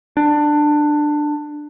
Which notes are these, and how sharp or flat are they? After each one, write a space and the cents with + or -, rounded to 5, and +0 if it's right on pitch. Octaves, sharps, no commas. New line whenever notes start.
D4 +15